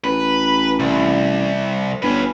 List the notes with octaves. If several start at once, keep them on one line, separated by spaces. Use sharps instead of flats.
A1 B4
C2
G1 C#4 B4